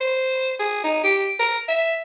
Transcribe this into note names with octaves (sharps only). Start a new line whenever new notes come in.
C5
G#4
D#4
G4
A#4
E5